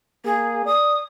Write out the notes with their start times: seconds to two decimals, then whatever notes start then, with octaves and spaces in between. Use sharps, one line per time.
0.25 A#3 G#4
0.66 D5 D#6